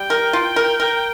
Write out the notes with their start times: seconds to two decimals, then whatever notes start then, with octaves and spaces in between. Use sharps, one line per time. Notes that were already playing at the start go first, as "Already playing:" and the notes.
Already playing: G3 G5
0.10 A#4
0.33 F4
0.56 A#4
0.80 A#4